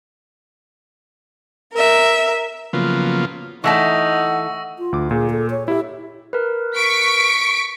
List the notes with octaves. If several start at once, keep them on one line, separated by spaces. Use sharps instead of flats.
A#4 E5
C#3 F3 F#3 A#3 B3 F4
E3 A3 D#4 F#5 A5 C#6 E6 A#6
F4
D2 D6
A#2 G#4
A4
C#5
E4 G4 E5
A#4 B4
C#6 B6 D7